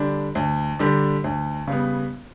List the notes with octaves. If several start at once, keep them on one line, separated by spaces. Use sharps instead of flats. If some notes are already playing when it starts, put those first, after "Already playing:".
Already playing: D3 G3 D4
D2
D3 G3 D4
D2
C#3 G3 B3